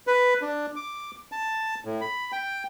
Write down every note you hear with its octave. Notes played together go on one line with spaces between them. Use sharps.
B4
D4
D6
A5
A2
B5
G5